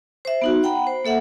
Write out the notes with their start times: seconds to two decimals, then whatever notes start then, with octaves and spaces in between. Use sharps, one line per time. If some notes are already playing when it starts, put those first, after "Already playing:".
0.25 C5 E5
0.42 B3 D#4 F#4
0.63 F#5 G5 A#5 B5
0.87 C5
1.05 A#3 A4 E5 F#5